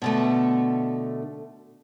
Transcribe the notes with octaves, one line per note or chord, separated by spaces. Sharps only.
B2 D3 A3